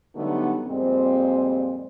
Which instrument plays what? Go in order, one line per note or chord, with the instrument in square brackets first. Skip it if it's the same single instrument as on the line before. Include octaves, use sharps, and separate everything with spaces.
[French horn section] D3 F#3 G3 A3 B3 D#4
F2 A#2 G3 G#3 C4